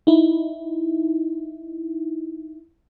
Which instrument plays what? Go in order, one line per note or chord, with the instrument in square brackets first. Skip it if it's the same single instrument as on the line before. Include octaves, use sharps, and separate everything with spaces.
[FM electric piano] D#4 E4